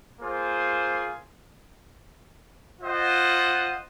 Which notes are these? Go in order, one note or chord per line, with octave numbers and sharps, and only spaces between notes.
A#3 F4 G#4 C5
F4 C5 D#5 F#5